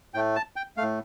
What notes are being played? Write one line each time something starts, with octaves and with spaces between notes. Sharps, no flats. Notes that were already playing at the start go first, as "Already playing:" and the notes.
A2 A3 G5
A5
G5
A3 F5
A2